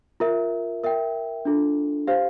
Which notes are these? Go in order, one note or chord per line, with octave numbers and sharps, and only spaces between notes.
F4 A#4 E5
A#4 E5 G5
D4 F4 A4
G4 C5 F5